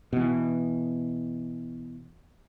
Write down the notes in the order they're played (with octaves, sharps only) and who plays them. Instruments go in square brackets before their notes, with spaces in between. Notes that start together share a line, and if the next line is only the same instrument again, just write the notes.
[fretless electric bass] B2 E3